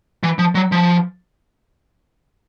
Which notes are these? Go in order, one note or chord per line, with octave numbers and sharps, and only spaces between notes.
E3
F3
F#3
F3